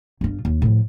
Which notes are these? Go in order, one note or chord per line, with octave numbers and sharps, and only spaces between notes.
G1 F4
D#2
A2 F3